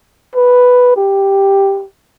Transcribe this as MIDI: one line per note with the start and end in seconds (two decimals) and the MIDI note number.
0.35 0.96 71
0.96 1.85 67